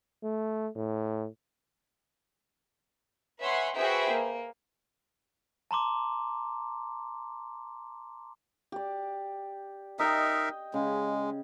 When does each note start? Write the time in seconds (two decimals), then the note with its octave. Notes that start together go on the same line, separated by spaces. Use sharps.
0.23 A3
0.75 A2
3.40 B4 C#5 E5 F#5 G#5 C6
3.75 F#4 G#4 B4 C5 E5 G5
4.11 A#3
5.71 A5 A#5 C6 D6
8.72 G4 D5
9.99 D#4 A#4 D#5 E5 G5
10.74 C#3 G#3